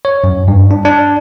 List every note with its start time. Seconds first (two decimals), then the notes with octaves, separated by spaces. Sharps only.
0.05 C#5
0.24 F#2
0.48 G2
0.71 D4
0.85 D4